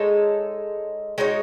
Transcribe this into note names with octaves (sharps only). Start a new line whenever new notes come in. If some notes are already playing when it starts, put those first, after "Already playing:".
Already playing: G#3 D#4 A4 C#5
G#3 D#4 F#4 C#5